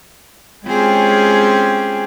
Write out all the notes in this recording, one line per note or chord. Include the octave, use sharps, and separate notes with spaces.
G#3 C4 C#4 F4 G4 G#4